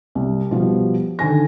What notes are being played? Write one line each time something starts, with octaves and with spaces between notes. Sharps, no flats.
C2
B2 F3 G3
D3 D#3 G#5 A#6